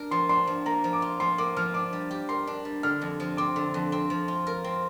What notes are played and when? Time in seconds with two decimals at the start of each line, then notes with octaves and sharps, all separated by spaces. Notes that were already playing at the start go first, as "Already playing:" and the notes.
Already playing: D4 A#4
0.11 F3 C6
0.29 D4 C6
0.47 F3
0.66 A#3 A#5
0.84 F3
0.93 D6
1.02 F4
1.20 F3 C6
1.38 A#3 D6
1.57 F3 F6
1.74 D4 D6
1.93 G3
2.11 G4
2.29 A#4 C6
2.47 D4
2.65 G3
2.83 D3 F6
3.02 F2
3.20 F3
3.37 C4 D6
3.56 D3
3.74 F2
3.92 C4
4.10 F3
4.28 F4
4.47 A#4
4.64 C4